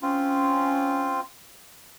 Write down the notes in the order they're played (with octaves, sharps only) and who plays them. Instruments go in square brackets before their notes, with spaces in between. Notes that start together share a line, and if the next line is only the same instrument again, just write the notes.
[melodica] C4 F4 [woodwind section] C#4